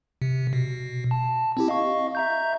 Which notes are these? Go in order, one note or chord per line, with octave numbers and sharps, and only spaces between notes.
C3
B2
A5
C4 E4 G4
D#5 F5 C#6
E5 A#5 G6